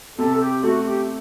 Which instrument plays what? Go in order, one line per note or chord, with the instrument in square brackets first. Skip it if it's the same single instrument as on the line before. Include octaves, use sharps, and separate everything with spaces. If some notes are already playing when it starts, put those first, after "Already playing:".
[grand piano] C3 [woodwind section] A4
[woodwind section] A4
G4
[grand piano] A3 [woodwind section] F#4
[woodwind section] G4